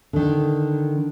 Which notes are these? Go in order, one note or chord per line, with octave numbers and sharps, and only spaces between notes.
D3 D#3